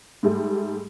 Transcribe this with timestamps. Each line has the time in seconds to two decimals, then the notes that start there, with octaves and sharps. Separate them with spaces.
0.23 G#2 G3 A3